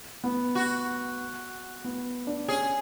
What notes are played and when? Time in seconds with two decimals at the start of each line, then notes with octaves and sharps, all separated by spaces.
0.24 B3
0.55 F#4
1.84 B3
2.27 D4
2.48 C#4 G#4